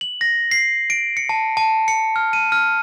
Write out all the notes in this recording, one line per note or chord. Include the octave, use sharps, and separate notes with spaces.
F#7
A#6
C7
D7
C#7
A5
A5
C#7
F6
D#7
F6